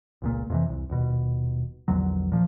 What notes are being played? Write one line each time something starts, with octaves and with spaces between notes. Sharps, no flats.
G1 C#2 A#2
F2 C3 E3
C2
D#1 B2
A#1 E2 D3 F#3
A#2 F3